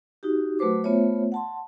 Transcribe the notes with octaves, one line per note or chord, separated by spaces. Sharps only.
D#4 F#4 G4
F#3 A3 F#4 B4 C5 D6
A3 B3 F4 C5 C#5 E5
F#5 A5 C6